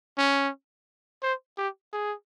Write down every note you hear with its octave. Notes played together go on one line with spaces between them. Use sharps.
C#4
C5
G4
G#4